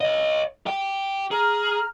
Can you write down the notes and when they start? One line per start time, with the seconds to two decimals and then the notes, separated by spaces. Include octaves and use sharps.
0.01 C#5 D#5
0.66 G4 G5
1.31 G#4 A#5 F6